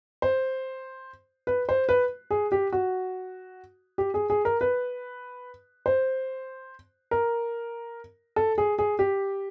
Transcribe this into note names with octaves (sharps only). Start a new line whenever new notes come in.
C5
B4
C5
B4
G#4
G4
F#4
G4
G#4
G#4
A#4
B4
C5
A#4
A4
G#4
G#4
G4